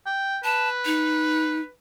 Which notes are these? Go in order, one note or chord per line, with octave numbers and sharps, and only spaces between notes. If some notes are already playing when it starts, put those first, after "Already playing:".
G5
B4 A5
D#4